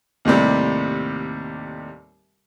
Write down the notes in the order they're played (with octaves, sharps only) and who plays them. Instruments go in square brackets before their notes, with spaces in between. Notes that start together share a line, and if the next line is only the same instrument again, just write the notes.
[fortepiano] D#2 A2 C3 G3